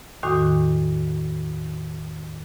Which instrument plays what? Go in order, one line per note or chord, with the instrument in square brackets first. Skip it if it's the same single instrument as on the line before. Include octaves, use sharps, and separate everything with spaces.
[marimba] E2 A2 D#3 F#4 D6 D#6